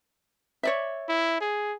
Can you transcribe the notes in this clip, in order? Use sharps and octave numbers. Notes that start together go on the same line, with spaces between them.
C#5 D5 E5
E4
G#4